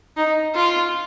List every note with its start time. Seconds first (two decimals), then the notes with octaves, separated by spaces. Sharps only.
0.17 D#4
0.55 F4